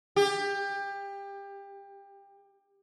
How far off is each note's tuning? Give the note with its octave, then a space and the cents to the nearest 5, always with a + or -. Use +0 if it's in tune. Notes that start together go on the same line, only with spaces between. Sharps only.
G4 +25